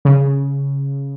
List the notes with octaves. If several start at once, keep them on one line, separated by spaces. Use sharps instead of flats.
C#3